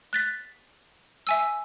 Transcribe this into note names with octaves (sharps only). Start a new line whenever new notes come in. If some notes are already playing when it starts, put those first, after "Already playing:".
F#6 A6 B6
E5 G#5 E6